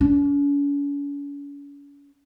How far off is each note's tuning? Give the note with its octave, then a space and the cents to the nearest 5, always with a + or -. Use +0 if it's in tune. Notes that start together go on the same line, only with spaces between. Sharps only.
C#4 +45